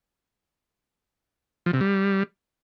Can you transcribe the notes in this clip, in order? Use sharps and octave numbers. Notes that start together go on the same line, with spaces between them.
F3
C3
G3